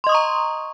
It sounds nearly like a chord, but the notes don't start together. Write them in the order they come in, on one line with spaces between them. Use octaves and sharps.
C6 D#5 D#6 C#6 A#5